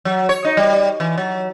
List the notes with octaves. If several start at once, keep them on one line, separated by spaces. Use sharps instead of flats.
F#3
C#5
D#4
G3
E3
F#3